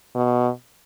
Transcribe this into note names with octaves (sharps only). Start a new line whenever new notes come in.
B2